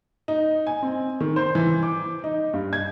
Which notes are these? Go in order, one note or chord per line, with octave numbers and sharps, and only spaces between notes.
D#4
G#5
C4
D#3
C5
E3
D6
D#4
G2
G#6